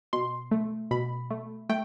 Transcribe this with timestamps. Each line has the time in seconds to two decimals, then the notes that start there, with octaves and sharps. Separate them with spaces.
0.13 B2 C6
0.51 A3
0.91 B2 B5
1.31 A3
1.69 A3 G5